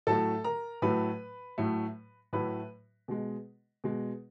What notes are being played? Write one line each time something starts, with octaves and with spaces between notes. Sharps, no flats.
A2 F#3 A3 A4 A5
A#4 A#5
A2 F#3 A3 B4 B5
A2 F#3 A3
A2 F#3 A3 B4 B5
B2 G#3
B2 G#3